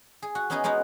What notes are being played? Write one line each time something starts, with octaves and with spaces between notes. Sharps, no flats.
G#4
F#4
B3 C#4 D#4 E4 G#4 D#5
G#3 B3 C#4 D#4 F#4